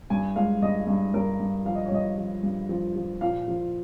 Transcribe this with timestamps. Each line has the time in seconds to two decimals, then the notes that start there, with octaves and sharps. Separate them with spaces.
0.10 G2 G#5
0.36 G#3 F5
0.62 G2 D#5
0.87 G2
1.14 G2 A#4
1.39 G2
1.65 F3 F5
1.75 D#5
1.86 C#5
1.91 G2 D#5
2.18 F3
2.43 G2
2.69 F3
2.96 F3
3.21 A#2 F5
3.48 F3